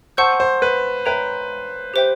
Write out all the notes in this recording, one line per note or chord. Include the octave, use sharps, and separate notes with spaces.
C5 F#5 A5 C#6 E6 G6
C5
B4
B4 C#5 E5 G5 A#5
G4 C5 E5 G5